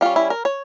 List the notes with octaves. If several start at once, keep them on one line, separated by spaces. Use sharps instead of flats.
G3 C#4 F4
E4
A#4
C#5